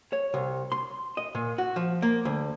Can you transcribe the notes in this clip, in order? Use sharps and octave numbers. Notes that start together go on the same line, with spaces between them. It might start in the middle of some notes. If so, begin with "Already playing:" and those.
C#5
C2
C6
D#5
A#2
F#4
F3
A#3
D2